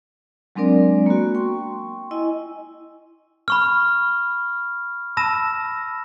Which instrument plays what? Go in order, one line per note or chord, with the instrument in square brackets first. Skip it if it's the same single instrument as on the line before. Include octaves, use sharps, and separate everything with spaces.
[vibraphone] F#3 G#3 C4 D4 A#4 D5
A#3 B3 F#4
G5 C6 C#6
E4 D#5 G#5
[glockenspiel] B5 C#6 F6
A5 B5 E6 A#6 E7